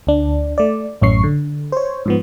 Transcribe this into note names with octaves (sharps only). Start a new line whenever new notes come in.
D2 D4
A3 D5
A1 F#2 A2 C#4 C#6 C7
D3
C5 C#5
G#2 F3 B3